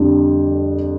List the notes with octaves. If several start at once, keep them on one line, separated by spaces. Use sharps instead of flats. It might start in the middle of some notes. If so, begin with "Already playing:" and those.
Already playing: F2 D3 G3 D4